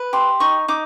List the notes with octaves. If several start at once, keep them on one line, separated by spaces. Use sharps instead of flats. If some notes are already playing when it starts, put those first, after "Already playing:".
Already playing: B4
G4 C6
D#4 C#6
D#4 D6